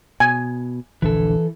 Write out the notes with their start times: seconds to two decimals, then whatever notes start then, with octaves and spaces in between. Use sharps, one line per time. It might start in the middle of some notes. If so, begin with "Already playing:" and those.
0.20 B2 G#5
1.02 D#1 A#1 D3 E3 A4